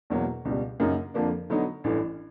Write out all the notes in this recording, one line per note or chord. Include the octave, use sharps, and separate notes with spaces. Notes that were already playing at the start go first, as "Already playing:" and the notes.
E2 B2 F#3 A#3
C#2 B2 G3
F#2 C#3 F#3 A#3 D#4
F2 D3 F3 A#3 D4
D3 F#3 B3 D#4
A1 G2 E3 A3